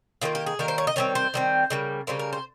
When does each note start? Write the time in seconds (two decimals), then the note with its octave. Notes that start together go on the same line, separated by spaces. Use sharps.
0.21 D#3 G3 A#3 F4
0.35 G4
0.47 G#4
0.59 D#3 G3 A#3 A#4
0.68 C5
0.78 C#5
0.87 D#5
0.96 D#3 G3 C4 C#5
1.15 C5
1.34 D#3 G3 C4
1.70 C#3 G3 A#3
2.07 C#3 G3 A#3 C5
2.19 A#4
2.33 C5